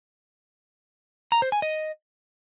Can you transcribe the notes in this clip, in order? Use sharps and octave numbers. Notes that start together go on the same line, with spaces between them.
A#5
C5
G#5
D#5